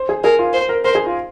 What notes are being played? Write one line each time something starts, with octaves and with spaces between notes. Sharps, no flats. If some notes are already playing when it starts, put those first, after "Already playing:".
Already playing: C5
G#4
G#4 A#4
F4
C5
A#4
A#4 C5
G#4
F4